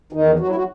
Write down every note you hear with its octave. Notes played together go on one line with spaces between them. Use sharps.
E2 D#3 D#4
F#3 F#4
E4
F#3 F#4